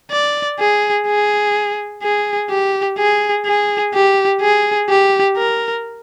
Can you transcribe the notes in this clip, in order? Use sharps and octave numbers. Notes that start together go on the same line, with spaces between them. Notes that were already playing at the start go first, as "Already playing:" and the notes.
D5
G#4
G#4
G#4
G4
G#4
G#4
G4
G#4
G4
A#4